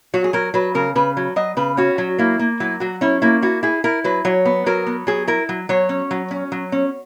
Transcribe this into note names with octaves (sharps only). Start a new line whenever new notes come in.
F#3 F#4
G#4
F#3 A#4
F#3 B4
C#3 A#4
C#3 B4
F#3
F#3 D#5
C#3 B4
C#4 F#4
F#3
A#3 E4
A#3
F#3 E4
F#3 F#4
C#4 E4
A#3 E4
E4 F#4
E4 G#4
E4 A#4
F#3 B4
F#3 C#5
B3
F#3 A#4
B3
F#3 G#4
E4 A#4
F#3
F#3 C#5
C#4
F#3
C#4
F#3
C#4